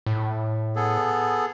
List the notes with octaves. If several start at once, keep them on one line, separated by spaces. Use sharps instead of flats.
A2
B3 G#4 A4